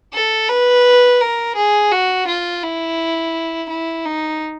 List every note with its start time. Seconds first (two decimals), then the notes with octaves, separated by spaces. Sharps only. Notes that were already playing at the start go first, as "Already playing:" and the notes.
0.14 A4
0.49 B4
1.21 A#4
1.56 G#4
1.91 F#4
2.27 F4
2.63 E4
3.70 E4
4.05 D#4